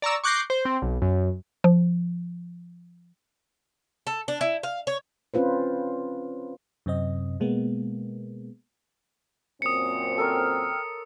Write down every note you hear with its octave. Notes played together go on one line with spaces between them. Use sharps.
D5 A#5 C#6 E6
C#6 D6 F#6 G6 A#6 C7
C5
C4
B1
F#2
F3
A4
D4
E4
F5
C#5
C4 C#4 F4 B4 C5
F#2 C3 C4 D#5
B2 G#3 A#3 B3
F#2 A#2 C4 D#6 C#7
A4 A#4 C#5 G5 E6 F6